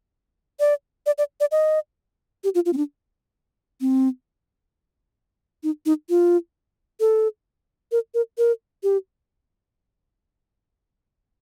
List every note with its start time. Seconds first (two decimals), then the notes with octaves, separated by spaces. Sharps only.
0.60 D5
1.06 D5
1.18 D5
1.40 D5
1.52 D#5
2.44 G4
2.55 F4
2.66 F4
2.73 C4
2.77 D4
3.81 C4
5.63 D#4
5.86 D#4
6.09 F4
7.00 A4
7.92 A#4
8.14 A#4
8.38 A#4
8.83 G4